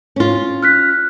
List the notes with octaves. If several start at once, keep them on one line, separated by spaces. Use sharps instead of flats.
C#4 F4
F6 F#6 B6